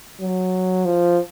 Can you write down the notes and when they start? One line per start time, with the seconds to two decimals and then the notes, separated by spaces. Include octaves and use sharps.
0.21 F#3
0.85 F3